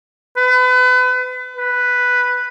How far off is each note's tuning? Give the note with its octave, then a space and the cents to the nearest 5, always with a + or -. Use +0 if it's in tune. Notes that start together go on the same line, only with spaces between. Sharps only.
B4 +35
B4 +0